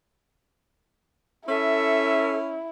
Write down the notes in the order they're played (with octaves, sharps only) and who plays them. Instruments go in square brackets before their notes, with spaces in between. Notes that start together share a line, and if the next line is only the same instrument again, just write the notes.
[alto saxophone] C#4 [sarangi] E4 [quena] A4 [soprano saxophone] E5